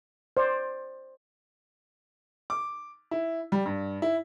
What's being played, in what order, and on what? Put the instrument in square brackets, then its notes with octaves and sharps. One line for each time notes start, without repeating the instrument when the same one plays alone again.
[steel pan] C5 D5
[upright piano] D6
E4
G3
G2
E4